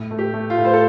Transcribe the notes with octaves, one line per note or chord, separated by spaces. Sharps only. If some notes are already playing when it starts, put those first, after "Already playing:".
Already playing: A2
A3
G4
A3
F4
A2
C5
A4